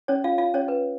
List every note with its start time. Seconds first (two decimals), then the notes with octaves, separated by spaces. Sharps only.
0.08 C#4 C#5
0.24 F4 F5
0.38 F4 F5
0.54 C#4 C#5
0.68 B4